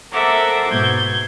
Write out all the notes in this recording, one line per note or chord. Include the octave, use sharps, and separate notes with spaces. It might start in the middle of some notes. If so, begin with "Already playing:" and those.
A4 A#4 C5 E5 F#5 D6
G#2 B2 G6 G#6